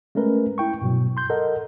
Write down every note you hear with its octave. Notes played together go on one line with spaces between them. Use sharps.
G#3 A3 C#4 A#4 B4
E4 G5 C#6
G2 B2 F#3
C6 G6
A4 A#4 D#5 F#5